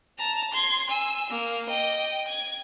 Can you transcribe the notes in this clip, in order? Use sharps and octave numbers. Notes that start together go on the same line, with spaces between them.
A5 A#5
C6 G#6
G#5 E6
A#3
D#5 G5
G#6